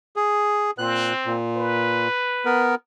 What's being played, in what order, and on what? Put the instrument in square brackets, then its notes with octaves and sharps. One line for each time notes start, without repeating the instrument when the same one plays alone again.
[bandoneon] G#4
[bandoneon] A#2 F#6 [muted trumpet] C4
[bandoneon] A#2
[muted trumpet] B4
[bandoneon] B3 A#4